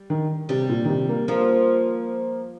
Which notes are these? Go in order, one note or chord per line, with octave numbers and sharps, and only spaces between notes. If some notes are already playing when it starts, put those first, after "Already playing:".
Already playing: G3
D#3
C3 G3
A#2
D#3
C3
A#3
F3 A#3